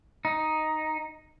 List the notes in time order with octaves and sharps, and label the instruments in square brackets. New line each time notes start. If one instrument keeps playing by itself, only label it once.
[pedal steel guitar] D#4